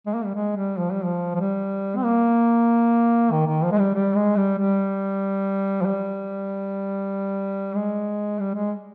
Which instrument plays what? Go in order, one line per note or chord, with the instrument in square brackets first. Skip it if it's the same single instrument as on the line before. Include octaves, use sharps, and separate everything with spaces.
[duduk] G#3
A#3
G3
G#3
G3
F3
G3
F3
F3
G3
C4
A#3
D#3
D#3
F3
G#3
G3
G3
G#3
G3
G3
F3
G3
G#3
G3
G#3